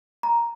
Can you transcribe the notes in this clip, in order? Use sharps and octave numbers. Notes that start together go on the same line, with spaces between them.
A#5